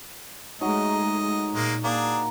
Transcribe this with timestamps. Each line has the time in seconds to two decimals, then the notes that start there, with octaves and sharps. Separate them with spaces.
0.61 F#3 G#3 A3 D#4 D#5
1.55 A#2 G#3 A#3
1.84 A#3 D4 G#4